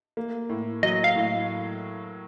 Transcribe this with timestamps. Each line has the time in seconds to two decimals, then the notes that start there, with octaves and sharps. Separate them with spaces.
0.17 A#3
0.49 A2
0.83 F#3 D#5
1.04 F5
1.16 A2